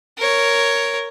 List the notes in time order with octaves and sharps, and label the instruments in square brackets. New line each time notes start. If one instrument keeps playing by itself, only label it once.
[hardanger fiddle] A#4 C#5